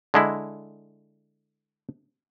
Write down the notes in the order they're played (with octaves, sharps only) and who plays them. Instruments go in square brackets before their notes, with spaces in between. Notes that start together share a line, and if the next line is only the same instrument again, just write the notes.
[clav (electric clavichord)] D3 G#3 E4